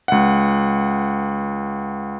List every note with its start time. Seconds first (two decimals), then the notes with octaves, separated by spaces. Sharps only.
0.08 C#2 F#5